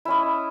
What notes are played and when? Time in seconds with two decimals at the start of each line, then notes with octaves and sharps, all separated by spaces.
0.05 E4
0.08 C#4
0.10 D#5